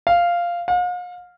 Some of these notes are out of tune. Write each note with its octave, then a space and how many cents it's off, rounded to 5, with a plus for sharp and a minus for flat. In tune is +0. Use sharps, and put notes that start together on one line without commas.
F5 -5
F5 +45